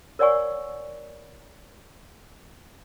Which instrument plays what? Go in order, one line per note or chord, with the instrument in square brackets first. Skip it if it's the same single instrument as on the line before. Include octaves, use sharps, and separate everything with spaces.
[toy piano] A#4 C#5 D5 F#5 G#5 C#6